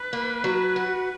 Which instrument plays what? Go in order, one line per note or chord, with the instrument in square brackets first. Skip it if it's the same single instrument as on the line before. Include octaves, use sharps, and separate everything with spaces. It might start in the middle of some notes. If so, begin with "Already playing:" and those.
Already playing: [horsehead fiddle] B4
[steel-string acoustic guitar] A#3
F#3
F#4